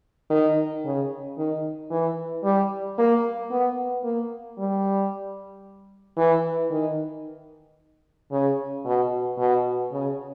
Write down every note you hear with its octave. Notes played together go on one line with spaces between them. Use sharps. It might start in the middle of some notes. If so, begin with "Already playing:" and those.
D#3
C#3
D#3
E3
G3
A#3
B3
A#3
G3
E3
D#3
C#3
B2
B2
C#3